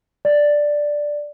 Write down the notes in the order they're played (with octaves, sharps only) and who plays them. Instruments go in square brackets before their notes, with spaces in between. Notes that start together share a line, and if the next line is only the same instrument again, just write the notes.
[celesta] D5